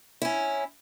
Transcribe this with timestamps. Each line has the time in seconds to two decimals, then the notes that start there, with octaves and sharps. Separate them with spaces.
0.22 C#4 E4